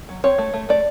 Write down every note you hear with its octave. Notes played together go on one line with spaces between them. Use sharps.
F#3
C4 C#5
A3
A3
A3 D5